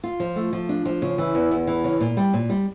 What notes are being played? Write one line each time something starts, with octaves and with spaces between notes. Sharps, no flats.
F4
F3
A3
F3
D4
F3
C#3
E3
E2
E2
E3
C#3
A#2
G3
A#2
G3